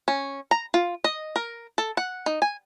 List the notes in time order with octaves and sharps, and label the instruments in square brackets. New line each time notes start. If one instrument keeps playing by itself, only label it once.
[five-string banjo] C#4
A#5
F4
D#5
A#4
A4
F#5
D#4
G#5